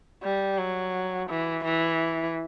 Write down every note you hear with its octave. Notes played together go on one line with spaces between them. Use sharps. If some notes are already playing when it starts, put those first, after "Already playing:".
G3
F#3
E3
E3